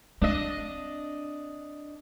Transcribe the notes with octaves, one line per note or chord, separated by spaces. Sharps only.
C4 D4 D#5